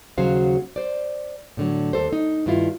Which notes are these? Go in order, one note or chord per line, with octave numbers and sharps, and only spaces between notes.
D#2 C#3 F#3 F#4 C5 F5
C5 D5
A2 D3 F#3
D#2 A4 C5
D#4
G2 D#3 E4 F4